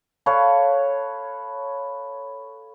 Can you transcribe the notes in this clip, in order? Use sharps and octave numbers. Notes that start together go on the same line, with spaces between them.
A4 B4 C#5 F5